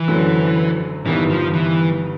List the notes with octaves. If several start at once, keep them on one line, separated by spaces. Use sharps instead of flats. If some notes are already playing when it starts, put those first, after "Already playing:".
Already playing: E3
F#1 F#2 D3 F#3 A3
G1 G2 D#3 E3 G3 B3
F3
E3